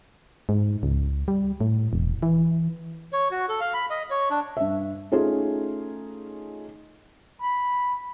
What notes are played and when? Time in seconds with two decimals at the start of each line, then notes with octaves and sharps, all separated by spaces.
0.49 G#2
0.83 C#2
1.28 G3
1.61 A2
1.93 E1
2.23 E3
3.13 C#5
3.31 F#4
3.49 A4
3.60 F5
3.74 B5
3.90 D#5
4.10 C#5
4.30 D4
4.57 G2 E5
5.12 A3 C#4 D#4 F4 G#4
7.41 B5